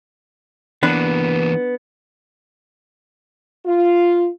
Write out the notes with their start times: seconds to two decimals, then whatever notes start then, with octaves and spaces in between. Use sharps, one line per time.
0.83 E3 A#3 B3 D4 B4
3.66 F4